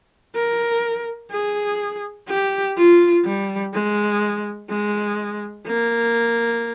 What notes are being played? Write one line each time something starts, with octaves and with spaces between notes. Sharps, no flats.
A#4
G#4
G4
F4
G3
G#3
G#3
A#3